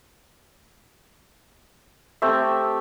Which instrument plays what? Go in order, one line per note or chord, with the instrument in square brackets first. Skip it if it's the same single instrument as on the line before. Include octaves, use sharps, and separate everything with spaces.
[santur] A3 C4 G4 E5